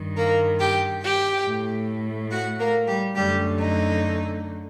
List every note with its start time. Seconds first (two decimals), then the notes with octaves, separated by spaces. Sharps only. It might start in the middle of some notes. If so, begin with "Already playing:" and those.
Already playing: G2 D#3
0.17 A#3 A#4
0.59 G4 G5
1.03 G4 G5
1.46 A2 A3
2.31 F#4 F#5
2.59 A#3 A#4
2.88 G3 G4
3.16 F#2 D3 G3 A3 G4
3.59 D#4